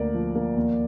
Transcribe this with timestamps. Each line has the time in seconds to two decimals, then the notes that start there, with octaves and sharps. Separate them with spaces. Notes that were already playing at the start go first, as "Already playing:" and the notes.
Already playing: D2 A#3 A#4 D5
0.14 F3
0.35 A#3
0.56 D#2